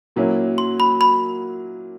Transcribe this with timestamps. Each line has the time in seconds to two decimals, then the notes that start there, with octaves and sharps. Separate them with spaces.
0.16 A#2 F#3 A#3 C#4 E4
0.58 C6
0.80 B5
1.01 B5